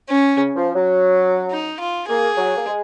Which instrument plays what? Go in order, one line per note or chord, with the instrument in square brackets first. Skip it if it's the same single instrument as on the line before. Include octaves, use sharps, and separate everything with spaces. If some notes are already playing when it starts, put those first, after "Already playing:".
[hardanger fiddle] C#4
[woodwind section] C#3
F3
F#3
[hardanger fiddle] D#4
F4
[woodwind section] A#3 [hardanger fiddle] G#4
[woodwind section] F#3
A#3
G#3